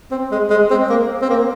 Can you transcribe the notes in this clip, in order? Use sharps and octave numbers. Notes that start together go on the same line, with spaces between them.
C4
G#3
G#3
C4
A#3
C4
A#3